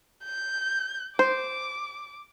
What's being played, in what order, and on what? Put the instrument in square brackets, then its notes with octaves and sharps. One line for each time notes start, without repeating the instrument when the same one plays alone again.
[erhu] G6
[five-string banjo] C5 [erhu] D6